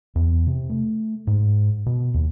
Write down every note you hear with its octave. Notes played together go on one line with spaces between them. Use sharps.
E2
C3
A3
G#2
B2
D#2